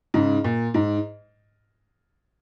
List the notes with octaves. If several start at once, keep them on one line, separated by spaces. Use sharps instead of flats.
G#2 C#3
A#2
G#2